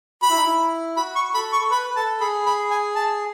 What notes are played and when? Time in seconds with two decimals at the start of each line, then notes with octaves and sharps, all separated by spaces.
0.22 F#4 B5
0.30 E4
0.37 D#4
0.44 E4
0.97 F#4 B5
1.15 C#6
1.34 A4 B5
1.53 C#6
1.61 A4
1.71 B4 B5
1.90 B4
1.96 A4 A5
2.20 G#4 B5
2.46 B5
2.70 G#5
2.96 A5